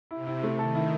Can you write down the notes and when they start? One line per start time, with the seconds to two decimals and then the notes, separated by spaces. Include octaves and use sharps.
0.11 C3 E4
0.27 E4
0.43 A3
0.59 D#3 A4
0.75 E4